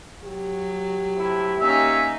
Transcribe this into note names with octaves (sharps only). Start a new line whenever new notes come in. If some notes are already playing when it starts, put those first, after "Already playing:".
F#3 G4
A2 C3 E4
A#3 C#4 D#4 E5